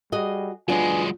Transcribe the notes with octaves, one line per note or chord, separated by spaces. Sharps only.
G3 F#4 G#4 D#5
F#3 G#3 B3 D4 D#4 F4 G#5